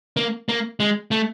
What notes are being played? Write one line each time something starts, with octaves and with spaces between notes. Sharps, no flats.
A#3
A#3
G#3
A3